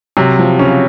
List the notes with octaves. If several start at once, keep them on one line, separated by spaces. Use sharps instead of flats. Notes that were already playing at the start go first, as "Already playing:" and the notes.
C3 F#3
F3
C#3 C#4